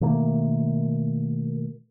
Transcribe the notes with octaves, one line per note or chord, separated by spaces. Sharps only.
B2 D#3 A3 A#3